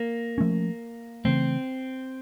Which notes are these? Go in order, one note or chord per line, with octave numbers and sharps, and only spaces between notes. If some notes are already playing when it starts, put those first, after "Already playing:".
Already playing: A#3
F3 A3 C#4
C#3 E3 A3 C4